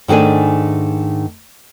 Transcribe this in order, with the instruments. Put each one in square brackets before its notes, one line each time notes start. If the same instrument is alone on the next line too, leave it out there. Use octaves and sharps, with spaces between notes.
[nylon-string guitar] G#2 D#3 A3 D4 G#5